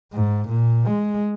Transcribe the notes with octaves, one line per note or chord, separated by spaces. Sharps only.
G#2
A#2
G#3